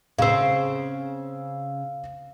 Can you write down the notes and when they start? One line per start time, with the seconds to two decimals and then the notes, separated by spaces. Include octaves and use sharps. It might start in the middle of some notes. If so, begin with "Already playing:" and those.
0.18 C#3 C4 F5 E6